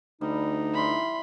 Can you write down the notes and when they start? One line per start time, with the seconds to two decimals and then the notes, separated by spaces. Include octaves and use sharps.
0.21 D2 G3 D#4
0.74 E3 G3 B5 C6